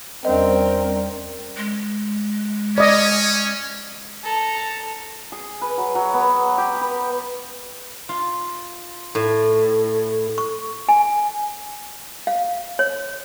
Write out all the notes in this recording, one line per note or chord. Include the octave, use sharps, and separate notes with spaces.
E2 G3 C4 C#4 A#4 D5 D#5 G5
G#3
C#4 D5 D#5
A4 A#5
G#4
B4
F#3
F#3
B3
G4
B4
F4
A2
C#6
G#5
F5
C#5